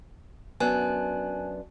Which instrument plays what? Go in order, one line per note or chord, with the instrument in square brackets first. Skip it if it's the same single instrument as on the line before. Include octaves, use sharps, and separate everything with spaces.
[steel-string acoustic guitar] F#2 B3 D4 [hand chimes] G#5 A5 F#6